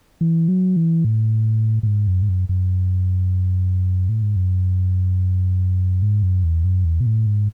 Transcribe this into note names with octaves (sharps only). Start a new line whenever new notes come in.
E3
F#3
E3
A2
A2
G#2
F#2
G#2
F#2
F#2
A2
G#2
F#2
G#2
F#2
E2
F#2
E2
B2
A2
G#2